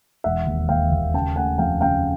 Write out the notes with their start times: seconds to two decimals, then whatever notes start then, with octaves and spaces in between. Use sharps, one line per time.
0.24 E1 E5 F#5
0.46 D#2
0.69 D#2 F5 G5
0.91 D#2
1.14 C#3 G5 A5
1.36 A3 F#5 G#5
1.58 F2 F5 G5
1.81 C#3 F5 G5